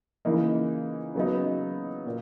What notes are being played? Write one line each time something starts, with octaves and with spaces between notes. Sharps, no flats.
C#3 E3 A#3 D#4
C#3 F#3 B3 D#4
A#2